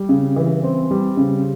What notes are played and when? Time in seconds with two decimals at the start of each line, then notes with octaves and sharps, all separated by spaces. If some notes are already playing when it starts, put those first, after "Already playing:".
Already playing: G3
0.09 C#3
0.36 E3
0.63 C4
0.91 G3
1.17 C#3